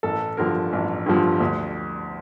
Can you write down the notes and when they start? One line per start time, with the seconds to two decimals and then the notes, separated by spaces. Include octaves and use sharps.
0.03 A1 A4
0.37 G2 D3 F3 A#4
0.73 A1
1.06 G2 D3 F3
1.40 D2